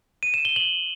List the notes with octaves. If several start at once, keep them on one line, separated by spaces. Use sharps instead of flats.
D#7
E7
G7
F#7